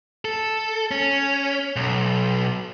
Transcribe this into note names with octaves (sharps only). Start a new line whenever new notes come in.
A4
C#4
B1